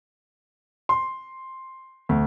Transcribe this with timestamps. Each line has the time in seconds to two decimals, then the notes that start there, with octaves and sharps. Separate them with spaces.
0.89 C6
2.09 D2